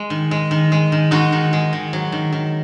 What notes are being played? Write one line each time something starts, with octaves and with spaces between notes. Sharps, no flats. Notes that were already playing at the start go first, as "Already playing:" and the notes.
Already playing: G#3
D#3
G#3
D#3
G#3
D#3
G#3 D#4 F#4
D#3
G#3
D#3
F#3
D#3
D#3